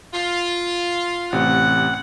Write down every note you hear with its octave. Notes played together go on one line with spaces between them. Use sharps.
F4
A1 C3 F#5